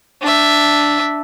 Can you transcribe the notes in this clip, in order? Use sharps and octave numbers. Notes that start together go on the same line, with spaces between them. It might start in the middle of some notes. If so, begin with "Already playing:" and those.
D4 E5